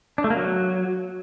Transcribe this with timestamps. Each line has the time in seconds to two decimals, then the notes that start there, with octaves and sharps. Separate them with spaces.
0.18 D4
0.24 A3
0.30 A#3
0.36 F#3